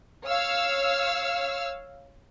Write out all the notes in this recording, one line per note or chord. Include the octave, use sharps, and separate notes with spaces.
C#5 F5 E6 F6